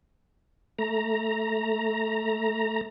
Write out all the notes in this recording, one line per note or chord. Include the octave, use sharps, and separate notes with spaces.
A3 A#5